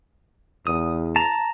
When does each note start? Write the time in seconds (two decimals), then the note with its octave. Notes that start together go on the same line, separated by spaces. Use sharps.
0.67 E2 D#6
1.16 A5 A#5